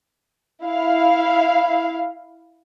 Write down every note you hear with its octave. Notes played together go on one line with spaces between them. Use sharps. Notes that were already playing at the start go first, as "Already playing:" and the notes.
E4 F5